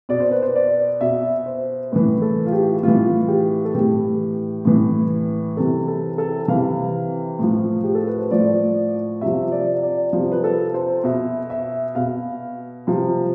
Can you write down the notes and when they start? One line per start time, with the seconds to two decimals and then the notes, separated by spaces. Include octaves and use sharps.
0.09 B2 D5
0.20 C5
0.31 B4
0.42 C5
0.56 D5
1.01 B2 E5
1.46 C5
1.92 A2 E3 B4
2.22 A4
2.46 F4
2.52 G4
2.83 A2 E3 F4
3.28 G4
3.65 A4
3.75 A2 E3 G4
4.65 A2 E3
5.57 C3 E3 A4
5.88 A4
6.18 A4
6.48 C3 E3 F5
7.39 A2 F3
7.84 G4
7.95 A4
8.07 B4
8.19 C5
8.31 A2 F3 D5
9.21 C3 F3 E5
9.52 D5
9.83 D5
10.13 C3 F3
10.32 B4
10.44 A4
10.74 C5
11.04 B2 E5
11.50 E5
11.95 B2 F5
12.87 C3 F3